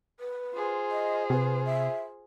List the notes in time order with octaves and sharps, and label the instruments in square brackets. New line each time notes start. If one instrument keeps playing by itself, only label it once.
[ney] B4
[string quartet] F4 G#4 C5
[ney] D#5
[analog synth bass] C3 [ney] B4
[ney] E5